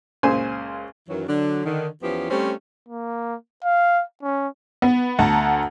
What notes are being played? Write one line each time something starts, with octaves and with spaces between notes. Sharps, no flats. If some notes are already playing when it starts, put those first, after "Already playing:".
C#2 A#2 C#3 C5 G#5 C6
F#2 D#3 E3 F#3
D3 F#3 D4
D3 D#3
E2 F3 B3 C#4 E4 G4
G3 A3 C4 C#4 G4 C5
A#3
F5
C#4
B3
D2 F#5 A5 A#5